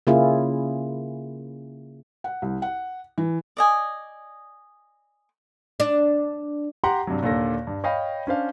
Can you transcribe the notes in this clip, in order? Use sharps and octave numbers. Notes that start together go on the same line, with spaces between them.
C#3 A#3 C#4 E4 F4 G#4
F#5
C2
F#5
E3
D5 D#5 G#5
D4
G4 F#5 A#5 C6
G2 C3 F#3
D#2 A#2 D3 A4 A#6
G2
C#5 D#5 F5 G5 B5
C#4 D4 C5 F5